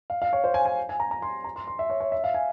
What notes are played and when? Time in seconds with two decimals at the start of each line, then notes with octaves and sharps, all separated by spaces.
0.10 F5
0.22 F5
0.33 C#5
0.44 C5
0.54 G#5
0.66 G#5
0.89 G#5
1.00 A#5
1.11 A#5
1.22 C6
1.44 A#5
1.56 C6
1.67 C6
1.79 E5
1.90 C#5
2.00 C#5
2.12 E5
2.24 F5
2.34 G#5